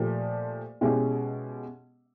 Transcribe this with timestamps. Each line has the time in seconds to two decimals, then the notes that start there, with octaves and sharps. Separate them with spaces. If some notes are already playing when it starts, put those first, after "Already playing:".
Already playing: A#2 F3 A3 G4
0.81 B2 G#3 C#4 E4 G4